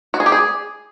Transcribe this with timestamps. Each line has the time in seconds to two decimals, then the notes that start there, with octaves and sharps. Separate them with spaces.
0.14 F#4
0.20 G#4
0.26 G4
0.32 G#4